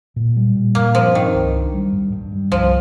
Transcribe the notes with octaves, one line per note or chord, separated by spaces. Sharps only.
A#2
G3
A#2
G2 A#3
F3 C4
D#3 C4
C2
D4
G3
G2
G2
G3
C2 F3